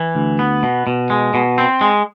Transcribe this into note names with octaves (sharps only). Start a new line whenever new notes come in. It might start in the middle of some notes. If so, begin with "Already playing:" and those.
Already playing: E3
D2
B3
B2
B2
G#3
B2
C4
G#3